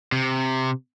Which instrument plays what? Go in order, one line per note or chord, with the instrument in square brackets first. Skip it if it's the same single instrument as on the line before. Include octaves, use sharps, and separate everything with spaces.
[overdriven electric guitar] C3